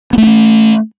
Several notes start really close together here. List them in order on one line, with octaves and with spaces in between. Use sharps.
B3 A3 D4 C#4